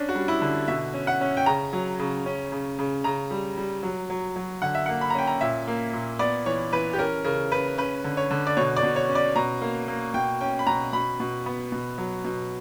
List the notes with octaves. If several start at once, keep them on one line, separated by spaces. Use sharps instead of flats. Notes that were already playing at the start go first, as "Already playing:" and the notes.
Already playing: C#4 D4
F#4
G3
E4
D3
B2 E5
C#4
F#5
C#4
G5
C#3 A#5
F#3
C#3
C#4
C#3
C#3
C#3 A#5
G3
G3
F#3
F#3
F#3
D3 F#5
E5
A#3 F#5
B5
A#5
C#4 G5
A#5
A#2 E5
A#3
A#2
B3 D5
E3 C#5
E3 B4
G4
C#4 A#4
C#3 A#4
C#3 B4
C#4 B4
D3
C#5
D3
D5
B2 C#5
D5
B2
C#5
C#4
D5
B2 A#5
A#3
A#3
B2 G5
C#4 G5
B5
B2 A#5
B2 B5
B2
B3
B2
F#3
B2